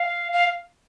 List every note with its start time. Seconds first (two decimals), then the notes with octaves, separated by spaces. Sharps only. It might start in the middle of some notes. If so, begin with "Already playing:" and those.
Already playing: F5
0.33 F5